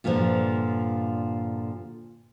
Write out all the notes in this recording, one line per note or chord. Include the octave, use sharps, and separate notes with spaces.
G2 A#2 D3 D#3 F3